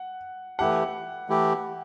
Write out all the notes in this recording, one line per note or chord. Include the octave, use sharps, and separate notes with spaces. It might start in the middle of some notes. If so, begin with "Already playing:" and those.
Already playing: F#5
E3 A3 E4 G4 F#5
E3 A3 E4 G4